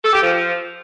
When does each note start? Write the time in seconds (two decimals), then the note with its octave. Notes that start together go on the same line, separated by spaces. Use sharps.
0.03 A4
0.12 G4
0.21 F3